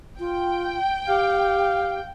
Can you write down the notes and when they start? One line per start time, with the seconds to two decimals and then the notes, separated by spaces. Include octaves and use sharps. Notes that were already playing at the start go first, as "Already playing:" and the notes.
0.20 F4 G5
1.08 G4 F5